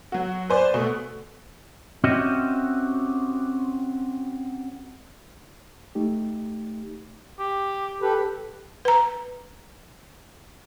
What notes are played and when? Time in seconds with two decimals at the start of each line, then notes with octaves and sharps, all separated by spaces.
0.12 F#3 F#4
0.50 B4 C5 D5 G#5
0.74 B2 A3
2.04 C4 C#4 F#4 G4 D#5 E5
5.95 A3 D#4 G4
7.39 G4
8.02 G4 A4 B4
8.85 B4 A#5